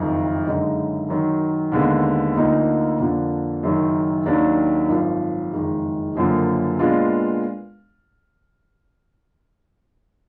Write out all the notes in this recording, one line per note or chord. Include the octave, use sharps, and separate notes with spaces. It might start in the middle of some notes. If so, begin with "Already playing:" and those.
Already playing: F#1 F2 D#3
F#1 F#2 D3 G#3 D#4
F#2 D#3 F#3
D#2 D3 G#3 B3
D2 D3 F3 A#3 D#4
F2 D3 F3 A#3 D4
F#1 F#2 D#3 F#3
D#2 D#3 F#3 D4
G#1 F#2 F3
F#1 F2 D#3 G#3
F#1 F#2 D3 F3 A#3
A#2 G#3 B3 D4 F4